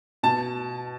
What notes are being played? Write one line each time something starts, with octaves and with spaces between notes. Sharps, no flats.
B2 A5